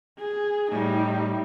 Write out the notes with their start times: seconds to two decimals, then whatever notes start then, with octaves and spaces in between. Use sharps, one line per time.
0.19 G#4
0.72 A2 G3 D#4